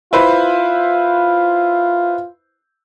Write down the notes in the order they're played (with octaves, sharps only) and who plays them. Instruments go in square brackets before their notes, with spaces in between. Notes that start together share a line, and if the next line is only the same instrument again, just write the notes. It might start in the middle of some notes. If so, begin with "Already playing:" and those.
[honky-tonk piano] E4 B4 C5 [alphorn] F4